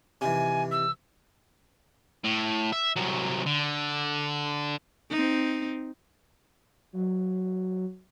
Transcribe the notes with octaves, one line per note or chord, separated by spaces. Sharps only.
C3 D#3 E3 G#5
E6
A2
E5
C2 F#3
D3
C4 D#4
F#3